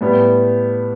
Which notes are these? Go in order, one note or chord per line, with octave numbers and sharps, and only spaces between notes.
A2 G3 B3